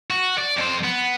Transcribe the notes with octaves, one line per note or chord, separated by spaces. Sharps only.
F#4
D5
F2 C5
B3